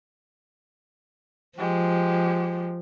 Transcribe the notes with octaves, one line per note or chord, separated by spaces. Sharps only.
F3 G#3 G4